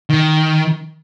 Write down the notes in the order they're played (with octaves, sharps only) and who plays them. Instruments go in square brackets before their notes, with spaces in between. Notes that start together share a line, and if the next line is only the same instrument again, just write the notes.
[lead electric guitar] D#3